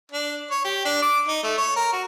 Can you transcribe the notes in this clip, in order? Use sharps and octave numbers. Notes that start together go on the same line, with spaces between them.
D4
C#5
G4
D4
D6
D#4
A3
C#5
A#4
F#4